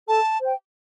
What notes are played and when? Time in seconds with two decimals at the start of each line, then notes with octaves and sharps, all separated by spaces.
0.08 A4 A5
0.41 C5 G5